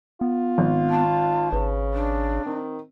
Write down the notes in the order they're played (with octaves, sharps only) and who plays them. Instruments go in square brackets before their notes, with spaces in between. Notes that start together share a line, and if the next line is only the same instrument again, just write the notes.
[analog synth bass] B3 [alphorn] F4
[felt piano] G#1
[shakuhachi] A5
[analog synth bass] G#1 [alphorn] C#3 [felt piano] B4
[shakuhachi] D4
[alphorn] D#3 [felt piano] C4